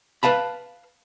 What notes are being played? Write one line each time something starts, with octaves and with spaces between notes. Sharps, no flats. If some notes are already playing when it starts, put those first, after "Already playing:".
B4 F5 A5 B5